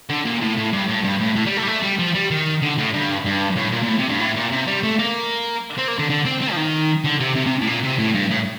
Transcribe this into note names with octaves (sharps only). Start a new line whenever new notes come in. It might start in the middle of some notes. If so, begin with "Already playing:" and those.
D3
A#2
A2
A2
G2
A2
G2
A2
A2
G3
A3
G3
A3
G3
F3
G3
D#3
D3
A2
G2
G2
A2
A#2
A#2
A2
C3
G2
A2
A#2
C3
G3
A3
A#3
C4
A#3
D3
D3
C4
C4
F3
D#3
D3
C3
C3
C3
A2
A#2
C3
A2
G2
A2